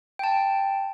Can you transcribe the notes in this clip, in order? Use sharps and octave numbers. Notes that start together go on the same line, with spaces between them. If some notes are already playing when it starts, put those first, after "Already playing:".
G5 A5